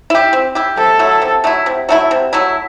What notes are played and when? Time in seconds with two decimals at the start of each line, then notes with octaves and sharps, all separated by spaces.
0.10 E4 G4
0.33 C4
0.55 E4 G4
0.77 C3 A4
0.99 F#3 A3 E4
1.22 C3
1.44 F#3 A3 E4
1.66 C3
1.89 F#3 A3 E4
2.11 C3
2.33 F#3 A3 E4